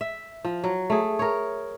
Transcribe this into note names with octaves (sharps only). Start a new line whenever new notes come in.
E5
F3
F#3
A3 G#4
A#4 C#5